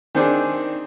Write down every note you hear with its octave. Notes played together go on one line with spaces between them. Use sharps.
D#3 C4 D4 G#4